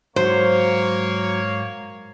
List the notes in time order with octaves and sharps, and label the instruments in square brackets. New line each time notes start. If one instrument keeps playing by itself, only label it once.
[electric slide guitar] G#2 F#4 [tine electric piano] F#3 [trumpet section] A#3 C#5 [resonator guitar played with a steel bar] C5